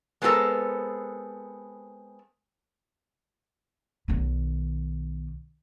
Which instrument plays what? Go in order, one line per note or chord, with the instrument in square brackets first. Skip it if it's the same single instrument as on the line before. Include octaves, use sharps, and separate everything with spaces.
[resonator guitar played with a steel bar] G#3 B3 C4 G4 A4 A#4
[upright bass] B1 D#3